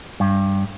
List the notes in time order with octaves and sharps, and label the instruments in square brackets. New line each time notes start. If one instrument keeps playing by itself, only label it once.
[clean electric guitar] G2